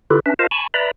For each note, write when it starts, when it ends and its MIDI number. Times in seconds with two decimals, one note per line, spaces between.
0.10 0.20 50
0.10 0.20 64
0.10 0.20 65
0.10 0.20 67
0.10 0.20 69
0.10 0.20 71
0.26 0.34 61
0.26 0.34 62
0.26 0.34 71
0.26 0.34 76
0.39 0.47 65
0.39 0.47 70
0.39 0.47 72
0.39 0.47 75
0.39 0.47 77
0.39 0.47 81
0.51 0.67 80
0.51 0.67 81
0.51 0.67 83
0.51 0.67 85
0.74 0.91 71
0.74 0.91 74
0.74 0.91 76
0.74 0.91 82
0.74 0.91 83